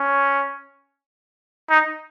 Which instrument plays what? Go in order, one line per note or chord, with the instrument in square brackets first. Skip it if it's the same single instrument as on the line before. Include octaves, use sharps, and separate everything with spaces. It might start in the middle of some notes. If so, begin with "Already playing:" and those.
Already playing: [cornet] C#4
D#4